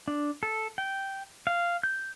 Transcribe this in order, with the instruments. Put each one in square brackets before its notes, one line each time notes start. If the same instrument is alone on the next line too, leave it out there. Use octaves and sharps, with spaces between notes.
[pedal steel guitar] D4
A4
G5
F5
G6